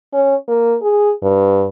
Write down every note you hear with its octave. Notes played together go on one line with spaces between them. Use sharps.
C#4
A#3
G#4
G2